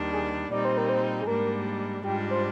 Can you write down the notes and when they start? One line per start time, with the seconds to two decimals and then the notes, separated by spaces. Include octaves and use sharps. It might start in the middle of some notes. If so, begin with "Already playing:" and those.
Already playing: D#2 D#3 G3 D4
0.13 G#4
0.51 A#2 G3 C4 D#4 D5
0.65 C5
0.77 A#4
0.89 C5
1.21 G#4
1.27 G#2 G3 A#3 D4 A#4
2.04 G#2 G3 D4 F4 G4
2.30 C5